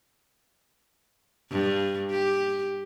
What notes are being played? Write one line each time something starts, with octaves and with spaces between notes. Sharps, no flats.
G2
G4